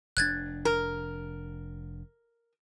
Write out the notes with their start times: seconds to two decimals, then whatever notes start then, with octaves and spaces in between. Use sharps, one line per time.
0.17 F1 D4 F#6 G#6 A6
0.65 A#4